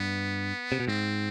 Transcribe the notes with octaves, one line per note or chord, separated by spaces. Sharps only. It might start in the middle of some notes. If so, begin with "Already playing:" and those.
Already playing: G2 B3
C3
B2
G#2 C4